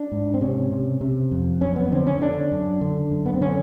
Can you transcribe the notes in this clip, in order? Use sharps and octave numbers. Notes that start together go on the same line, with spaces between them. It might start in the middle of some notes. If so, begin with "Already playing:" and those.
Already playing: D4
G#2
C4
C3 C#4
C3
C3
F2
F#2 C#4
B3
D3 C4
C#4
D3 D4
F#2
D3
F#2
B3
C4
D3 C#4